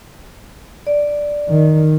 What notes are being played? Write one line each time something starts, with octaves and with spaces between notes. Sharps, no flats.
D5
D#3